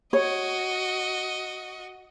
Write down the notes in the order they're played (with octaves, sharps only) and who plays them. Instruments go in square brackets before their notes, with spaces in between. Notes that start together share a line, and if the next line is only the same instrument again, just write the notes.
[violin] F#4 D#5 [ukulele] C#5